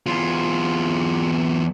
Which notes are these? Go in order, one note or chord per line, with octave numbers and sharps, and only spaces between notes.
E2 F4